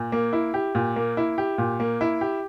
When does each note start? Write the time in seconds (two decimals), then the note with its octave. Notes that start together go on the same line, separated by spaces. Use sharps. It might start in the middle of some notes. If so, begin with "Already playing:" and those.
Already playing: A#2
0.12 A#3
0.33 E4
0.54 G4
0.75 A#2
0.96 A#3
1.17 E4
1.38 G4
1.58 A#2
1.80 A#3
2.01 E4
2.21 G4